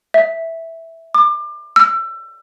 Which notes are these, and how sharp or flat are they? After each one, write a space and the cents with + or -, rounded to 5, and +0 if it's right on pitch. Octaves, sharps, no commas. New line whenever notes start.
E5 -5
D6 +30
E6 +30